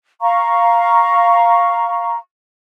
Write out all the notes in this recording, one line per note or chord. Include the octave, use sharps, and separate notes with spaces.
F5 A#5 C#6